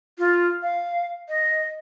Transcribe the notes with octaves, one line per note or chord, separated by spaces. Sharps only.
F4
F5
D#5